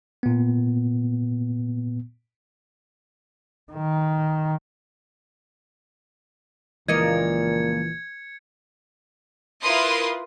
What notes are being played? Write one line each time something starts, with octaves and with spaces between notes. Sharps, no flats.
A#2 B3
D#3
C#2 A#2 E3 F3 A#3 D#5 G#6 C#7
E4 F4 A#4 B4 C6 D#6